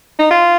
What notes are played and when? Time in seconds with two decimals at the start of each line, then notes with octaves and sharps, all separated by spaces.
0.19 D#4
0.31 F4